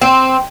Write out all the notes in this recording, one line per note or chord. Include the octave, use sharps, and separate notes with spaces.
C4